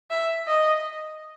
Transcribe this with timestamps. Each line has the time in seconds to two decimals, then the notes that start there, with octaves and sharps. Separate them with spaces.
0.10 E5
0.47 D#5